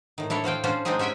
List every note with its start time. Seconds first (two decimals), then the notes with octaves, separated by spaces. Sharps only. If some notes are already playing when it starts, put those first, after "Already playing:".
0.18 A2 D#3
0.30 D4 E4 A4 C#5
0.44 F3 F#4 F5 G5
0.64 C#4 D4 F4 F#4 C5
0.85 G#3 C4 D4 D#4 G4 G#4
0.99 C#4 F#4 E5 G5 G#5